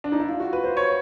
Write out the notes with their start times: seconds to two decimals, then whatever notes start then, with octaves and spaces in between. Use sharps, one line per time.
0.04 D4
0.12 D#4
0.20 E4
0.28 F4
0.40 F#4
0.53 B4
0.64 C5
0.77 C#5